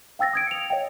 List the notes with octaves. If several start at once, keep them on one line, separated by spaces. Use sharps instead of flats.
F5 G5 E6 A6 A#6
D#6 G#6 D7
C#7 F7
C#5 D#5 F5 G5